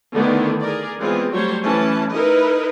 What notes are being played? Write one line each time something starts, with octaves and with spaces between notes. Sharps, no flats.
D3 D#3 A3 B3 D4 E4
G#4 A#4 D5
E3 G#3 B3 C4 F4 G#4
F#3 G3 A3 C5 C#5
E3 A3 C#4 E4 A5
D#4 E4 A#4 B4 D#5